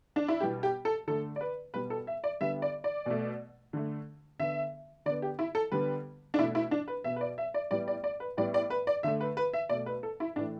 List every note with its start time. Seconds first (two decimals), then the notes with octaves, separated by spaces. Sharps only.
0.16 D4
0.28 E4
0.40 B2 G3 B3 G4
0.63 G4
0.85 A4
1.07 D3 A3 A4
1.36 D5
1.41 B4
1.74 B2 G3 B3 B4
1.90 A4
2.07 E5
2.24 D5
2.41 D3 G3 B3 E5
2.62 D5
2.84 D5
3.06 B2 A3
3.73 D3 A3
4.39 D3 B3 E5
5.06 D3 D5
5.10 B3
5.22 G4
5.39 E4
5.55 A4
5.72 D3 G3 B3 B4
6.34 D4
6.38 B2 E4
6.41 A3
6.55 E4
6.71 D4
6.88 B4
7.04 B2 B3 E5
7.16 B4
7.21 D5
7.38 E5
7.54 D5
7.71 A2 G3 B3 D5
7.88 D5
8.04 D5
8.20 B4
8.37 A2 G3 B3 D5
8.54 D5
8.70 B4
8.87 D5
9.03 D3 A3 E5
9.21 B4
9.37 B4
9.53 E5
9.69 B2 A3 D5
9.86 B4
10.03 A4
10.20 E4
10.36 A2 E3 A3 D4